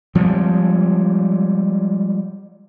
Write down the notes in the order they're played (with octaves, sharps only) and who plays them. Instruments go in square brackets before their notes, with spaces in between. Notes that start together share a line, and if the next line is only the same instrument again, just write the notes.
[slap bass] F3 G3 G#3 C4